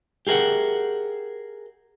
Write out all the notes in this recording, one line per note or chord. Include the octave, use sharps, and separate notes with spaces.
G4 G#4 A#4 E5 F#5